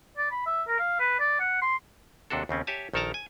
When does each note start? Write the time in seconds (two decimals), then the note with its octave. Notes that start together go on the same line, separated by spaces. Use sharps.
0.17 D5
0.31 B5
0.46 E5
0.67 A#4
0.79 F5
0.99 B4
1.19 D5
1.39 F#5
1.62 C6
2.30 D#2 C3 D4 F#4 A4
2.49 D#2 C#3 C4 C#4
2.67 G4 C#5 E5 G#5 A5
2.93 A#1 D#3 A4 A#4 A5 A#5
3.14 G#5